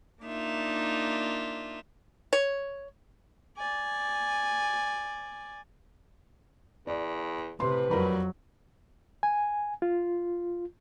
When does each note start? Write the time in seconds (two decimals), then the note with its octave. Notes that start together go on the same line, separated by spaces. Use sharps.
0.23 A#3 D4 D#4 F4 E5
2.33 C#5
3.58 D5 G#5
6.87 E2 D5
7.60 A2 C3 B4 C6
7.91 F2 F#3 G3 A#4 A#5 B5
9.23 G#5
9.82 F4